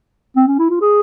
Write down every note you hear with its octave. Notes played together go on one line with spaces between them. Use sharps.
C4
C#4
E4
F4
G#4